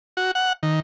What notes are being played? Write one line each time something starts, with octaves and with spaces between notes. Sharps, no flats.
F#4
F#5
D#3